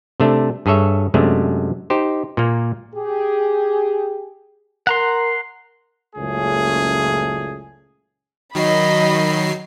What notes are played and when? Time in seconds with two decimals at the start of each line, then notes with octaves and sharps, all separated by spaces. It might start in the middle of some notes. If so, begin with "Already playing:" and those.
0.20 C3 A3 D4
0.66 G2 G#4 A4 C#5 E5
1.14 F#2 C3 G#3 A3 D4
1.90 D#4 G4 C5
2.37 A#2 A#3
2.95 G4 G#4
4.87 A#4 F#5 A#5 C6
6.16 F#1 C#2 A#2 A3 C#4 G#4
8.55 D#3 F#3 D#5 B5 C7